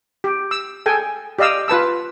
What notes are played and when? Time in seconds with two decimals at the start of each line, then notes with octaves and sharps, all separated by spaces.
0.24 G4
0.51 E6
0.86 G#4 A4 G5 G#5
1.39 G4 D5 D#5 F5 E6
1.68 F4 B4 A5 E6